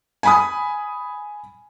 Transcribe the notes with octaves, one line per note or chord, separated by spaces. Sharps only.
G#5 B5 D#6